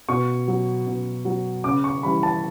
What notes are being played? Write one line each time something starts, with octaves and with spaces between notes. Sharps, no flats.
B2 C#6
F#3
B2
F#3
C#3 D6
C#6
E3 G3 B5
A5